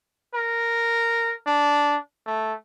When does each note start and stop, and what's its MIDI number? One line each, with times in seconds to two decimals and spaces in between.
0.35 1.35 70
1.47 1.97 62
2.26 2.53 57